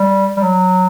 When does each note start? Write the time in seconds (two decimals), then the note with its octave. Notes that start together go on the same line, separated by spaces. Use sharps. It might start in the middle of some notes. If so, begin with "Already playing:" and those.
Already playing: G3
0.37 G3
0.40 F#3